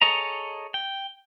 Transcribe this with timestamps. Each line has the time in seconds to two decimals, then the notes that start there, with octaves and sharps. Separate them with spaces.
0.02 G#4 A4 C#5 D#5 A#5
0.74 G5